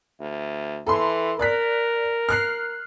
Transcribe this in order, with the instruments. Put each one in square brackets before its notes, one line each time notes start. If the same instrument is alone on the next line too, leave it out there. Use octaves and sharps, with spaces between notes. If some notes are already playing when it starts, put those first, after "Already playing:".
[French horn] D2
[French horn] E3 [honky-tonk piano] A4 B5 C6
[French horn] A#4 [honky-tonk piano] D5 F#6 B6
[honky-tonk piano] F6 F#6 C7